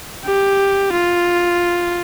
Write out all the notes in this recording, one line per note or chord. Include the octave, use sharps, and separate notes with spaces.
G4
F4